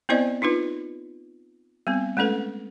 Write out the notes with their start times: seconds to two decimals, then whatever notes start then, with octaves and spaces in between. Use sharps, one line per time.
0.09 B3 C4 E4 C5 D5 D#5
0.42 D4 D#4 F4 B4
1.87 G3 B3 C4
2.17 G#3 A3 C#4 A4 B4